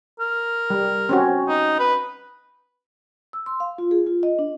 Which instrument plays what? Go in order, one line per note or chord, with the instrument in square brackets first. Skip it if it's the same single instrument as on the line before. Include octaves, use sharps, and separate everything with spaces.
[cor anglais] A#4
[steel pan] G3
C4 C#4 F#4
[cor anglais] D#4
B4
[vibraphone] E6
C6
F5
F4
G#4
F4
D#5
D4